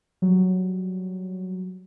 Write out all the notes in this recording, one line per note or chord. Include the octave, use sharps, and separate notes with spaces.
F#3 G3